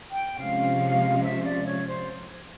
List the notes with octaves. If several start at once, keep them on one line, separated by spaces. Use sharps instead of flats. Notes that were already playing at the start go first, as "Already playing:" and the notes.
G5
C3 F3 G#3 C#4 F5
E5
D5
C#5
C5